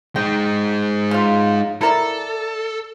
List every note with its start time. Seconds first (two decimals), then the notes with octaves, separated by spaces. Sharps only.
0.16 G#3 D#4 G5
1.11 C#3 F4
1.81 E4 A4 A#4 D5